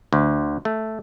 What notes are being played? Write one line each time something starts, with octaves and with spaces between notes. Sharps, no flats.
D2
A3